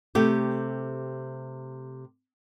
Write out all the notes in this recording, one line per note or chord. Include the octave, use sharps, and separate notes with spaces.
C3 A3 G4